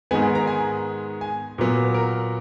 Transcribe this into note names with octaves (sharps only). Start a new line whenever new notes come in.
G#2 D#3 G#3 B3 G#5
G#5
A#5
G#5
G#5
A#2 F#3 B3
A#4